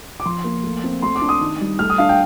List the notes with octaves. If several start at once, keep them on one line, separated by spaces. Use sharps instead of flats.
D6
F3 C6
A#3
A3
C4
A3 C6
D6
D4
D#6
D#3
G3
A3 F6
D#6
D4 F5
G5